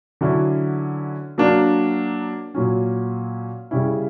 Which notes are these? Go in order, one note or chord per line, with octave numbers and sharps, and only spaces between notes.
D3 F#3 C#4 E4
F#3 A#3 D4
A#2 F#3 C#4
C#3 G3 C#4 E4